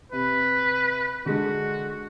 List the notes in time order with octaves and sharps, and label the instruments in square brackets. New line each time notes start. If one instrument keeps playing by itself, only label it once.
[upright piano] C3 [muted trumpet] B4
[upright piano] D3 G#3 [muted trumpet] F#4